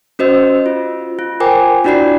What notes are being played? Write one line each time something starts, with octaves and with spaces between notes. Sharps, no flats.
C#4 F#4 C5 D#5 E6
F4
F4
F4 A#4 C5 G5 G#5 D6
D4 E4 F#4 D5 B5 C7